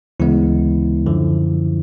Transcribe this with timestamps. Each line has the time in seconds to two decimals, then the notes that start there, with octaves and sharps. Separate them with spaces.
0.20 D2 C#3 E3 G#3 B3 E4
1.06 F#2 D3 F3